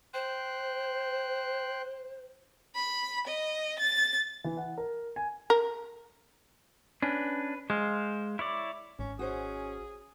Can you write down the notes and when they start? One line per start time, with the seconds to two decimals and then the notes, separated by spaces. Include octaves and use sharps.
0.14 C5 G5 C6 F#6
2.74 B5
3.27 D#5
3.79 A6
4.44 E3
4.57 F#5
4.78 A#4
5.16 G#5
5.50 A#4
7.03 C#4 D4 B4
7.70 G#3 C5 F5
8.39 E4 C#5 D5
8.99 G#1 C#4
9.19 C#4 F#4 G#4 C5 D#5